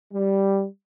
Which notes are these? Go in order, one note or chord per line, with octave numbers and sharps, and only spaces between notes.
G3